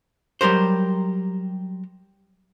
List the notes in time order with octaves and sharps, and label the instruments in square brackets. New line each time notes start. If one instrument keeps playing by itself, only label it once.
[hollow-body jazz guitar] F#3 G3 G4 A#4 C5